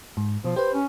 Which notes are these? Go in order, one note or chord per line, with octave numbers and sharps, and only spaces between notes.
G#2
B2 F3
G4 B4 C5
C#4